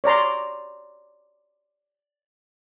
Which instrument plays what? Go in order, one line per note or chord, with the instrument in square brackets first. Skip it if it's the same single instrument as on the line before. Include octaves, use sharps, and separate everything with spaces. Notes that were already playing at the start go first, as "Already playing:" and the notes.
[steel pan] C#5 D5 A#5 C6